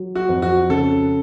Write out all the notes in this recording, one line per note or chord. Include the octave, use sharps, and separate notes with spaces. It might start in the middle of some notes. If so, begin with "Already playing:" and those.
Already playing: F#3
F#4
F2
F#4
C#3 A4